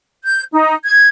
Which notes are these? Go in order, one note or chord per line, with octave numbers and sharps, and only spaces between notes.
G6
D#4
G#6